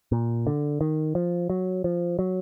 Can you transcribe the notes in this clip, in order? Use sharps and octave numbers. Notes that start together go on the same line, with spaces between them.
A#2
D3
D#3
F3
F#3
F3
F#3